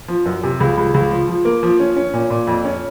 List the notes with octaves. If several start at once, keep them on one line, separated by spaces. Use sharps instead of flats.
F3
F#2
C3
C#2
C#2
C#2
F3
F3
A#3
F3
C#4
C#4
A#2
A#2
F2
C#4